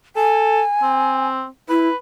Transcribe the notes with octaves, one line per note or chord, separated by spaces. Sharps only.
A4 G#5
C4
E4 B4